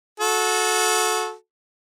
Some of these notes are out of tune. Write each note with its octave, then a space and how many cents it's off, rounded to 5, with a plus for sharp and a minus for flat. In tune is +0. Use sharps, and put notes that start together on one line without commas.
F#4 -25 A4 -20